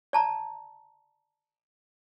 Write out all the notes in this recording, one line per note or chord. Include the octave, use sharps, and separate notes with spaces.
D5 A5 A#5